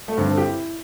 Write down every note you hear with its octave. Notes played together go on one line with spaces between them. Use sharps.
A3
G2 D3 C4
A4
G4
E4